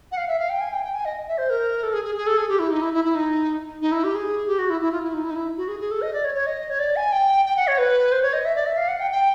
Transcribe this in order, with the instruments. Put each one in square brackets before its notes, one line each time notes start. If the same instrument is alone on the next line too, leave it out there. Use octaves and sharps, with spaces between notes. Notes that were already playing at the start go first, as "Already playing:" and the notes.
[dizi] F#5
F5
E5
F5
G5
G#5
G5
G5
G#5
D#5
E5
C5
A#4
A4
G#4
G#4
G#4
A4
G#4
G4
E4
D#4
E4
E4
E4
D#4
D#4
E4
G4
G#4
G4
F#4
E4
E4
F4
E4
D#4
E4
D#4
E4
F#4
G#4
G#4
A4
D#5
D5
C#5
C#5
D#5
C#5
D5
G#5
G5
G5
F#5
C#5
B4
C5
C#5
D#5
E5
D5
E5
F5
F#5
G5
G5